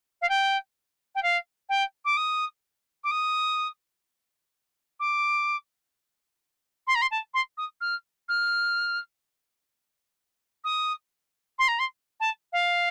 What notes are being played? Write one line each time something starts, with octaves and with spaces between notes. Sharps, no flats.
F5
G5
G5
F5
G5
D6
D#6
D6
D#6
D6
C6
A#5
C6
A5
C6
D#6
F6
F6
D#6
C6
A#5
C6
A5
F5